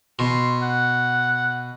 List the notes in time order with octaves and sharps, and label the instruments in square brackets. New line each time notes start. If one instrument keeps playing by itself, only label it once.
[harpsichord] B2 [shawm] C6
[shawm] F#5